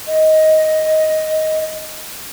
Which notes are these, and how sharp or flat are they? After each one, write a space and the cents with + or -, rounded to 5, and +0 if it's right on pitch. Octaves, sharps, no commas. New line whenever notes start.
D#5 +10